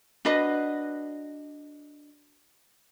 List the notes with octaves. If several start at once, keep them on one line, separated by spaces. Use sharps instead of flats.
D4 F#4 B4 D#5